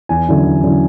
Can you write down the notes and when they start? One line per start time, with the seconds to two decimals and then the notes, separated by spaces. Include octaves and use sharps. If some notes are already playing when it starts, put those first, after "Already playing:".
0.09 E2 G#5
0.28 D3 F#3 C#4 E4
0.45 E2
0.64 D3 F#3 C#4 E4